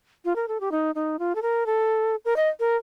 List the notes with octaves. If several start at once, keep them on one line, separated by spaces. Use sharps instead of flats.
F4
A#4
A4
G4
D#4
D#4
F4
A4
A#4
A4
A#4
D#5
A#4